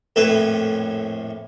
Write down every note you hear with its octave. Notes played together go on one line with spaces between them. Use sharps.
A#1 F2 A2 E4 A4 B4